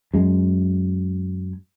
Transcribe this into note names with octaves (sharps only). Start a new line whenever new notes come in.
F#2 G#3